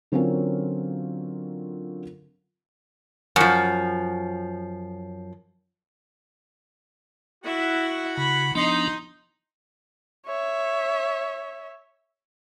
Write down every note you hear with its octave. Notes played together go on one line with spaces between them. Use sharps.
D3 F#3 C4 C#4 F4 A#4
F#2 F3
E4 F#4 E5
C#3 B5
F3 B3 D4 D#4 C6
C#5 E5